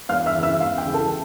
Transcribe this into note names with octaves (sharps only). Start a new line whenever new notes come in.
E2 F5 F6
E5 E6
C#3 E3
E5 E6
E2 F5
G5
C#3 E3
A4 A5